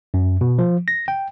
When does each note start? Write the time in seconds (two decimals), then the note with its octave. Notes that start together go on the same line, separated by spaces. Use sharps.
0.14 F#2
0.41 B2
0.59 F3
0.88 A#6
1.08 G5